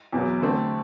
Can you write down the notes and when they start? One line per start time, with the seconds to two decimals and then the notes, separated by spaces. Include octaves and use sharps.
0.13 E2 B2 F#3 B3
0.41 D3 A3 C4